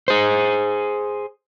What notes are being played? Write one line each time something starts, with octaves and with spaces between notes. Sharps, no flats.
G#4 C5